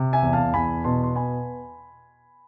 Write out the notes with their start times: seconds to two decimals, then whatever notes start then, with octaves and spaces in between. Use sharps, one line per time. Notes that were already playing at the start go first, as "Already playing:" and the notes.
Already playing: C3
0.13 E5 G#5
0.22 E2
0.33 F5 A5
0.54 E2 G#5 B5
0.84 B2 A5 C6
1.03 C6
1.15 B3 G#5 B5